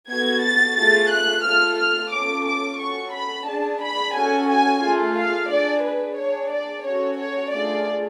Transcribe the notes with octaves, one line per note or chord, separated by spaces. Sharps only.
B3 F#4 A4 G#6
A6
A3 F4 G#4 A6
F#6
A3 F4 A4 F6
F6
C#4 F4 A4 D6
D6
C#4 F#4 A4 C#6
B5
D4 G#4 A5
B5
C#4 F#4 A4 G#5
G#5
A3 F4 G#4
F5
D4 G#4 D5
B4
D4 G#4 C#5
D5
C#4 F#4 A4 C#5
C#5
A3 D4 F4 G#4 D5